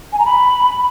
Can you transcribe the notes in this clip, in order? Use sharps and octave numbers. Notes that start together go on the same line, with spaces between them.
G#5
A#5
B5